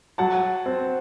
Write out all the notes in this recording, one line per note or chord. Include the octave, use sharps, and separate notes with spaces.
F#3 F#5 A5
C4